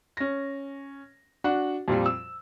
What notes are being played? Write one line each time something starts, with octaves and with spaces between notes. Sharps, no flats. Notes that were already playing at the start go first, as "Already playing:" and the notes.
C#4 A#6
D4 F#4 F#5
F2 A#2 F3 G3
E6